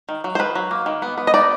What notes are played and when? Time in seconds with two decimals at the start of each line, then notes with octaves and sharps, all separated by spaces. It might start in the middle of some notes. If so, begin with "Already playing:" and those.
0.09 D#3
0.24 F#3
0.35 C5
0.39 D#3 B4
0.55 F#3
0.71 A#3
0.86 D#3
1.02 B3
1.18 B3
1.27 D#5
1.34 D#4 D5